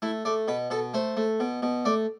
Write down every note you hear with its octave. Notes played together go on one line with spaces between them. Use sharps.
A3 E4
A3 D5
B2 B4
B2 A4
A3 C5
A3
B2
B2
A3 D5